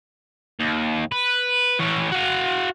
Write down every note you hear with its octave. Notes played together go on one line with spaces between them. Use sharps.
D#2
B4
E3 C#4
F#4 F5